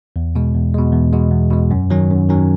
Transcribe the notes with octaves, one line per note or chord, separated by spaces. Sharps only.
E2
B2 G#3
E2
B2 G#3
E2
B2 G#3
E2
B2 G#3
F#2
D#3 F#3 C#4
F#2
D#3 F#3 C#4